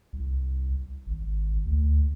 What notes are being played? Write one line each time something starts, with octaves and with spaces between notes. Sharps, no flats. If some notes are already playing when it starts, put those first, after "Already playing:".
C2
G#1
D2